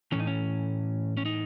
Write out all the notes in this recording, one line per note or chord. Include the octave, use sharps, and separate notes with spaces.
A2 E3 C#4
D#4
C#4
C#4
D#4